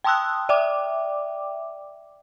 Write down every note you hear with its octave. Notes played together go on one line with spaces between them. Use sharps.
G5 A5 C6 D#6 E6 F#6
D5 E5 G5 D6